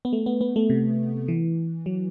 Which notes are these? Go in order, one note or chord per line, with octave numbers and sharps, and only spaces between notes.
B3
A3
B3
B3
A3
C3
E3
F#3